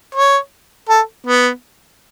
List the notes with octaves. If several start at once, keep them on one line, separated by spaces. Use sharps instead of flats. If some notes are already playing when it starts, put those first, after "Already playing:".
C#5
A4
B3